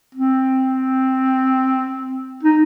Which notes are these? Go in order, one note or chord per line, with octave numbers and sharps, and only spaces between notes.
C4
D#4